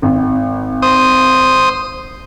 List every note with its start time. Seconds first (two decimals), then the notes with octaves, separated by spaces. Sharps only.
0.02 G#1
0.82 C5 D#6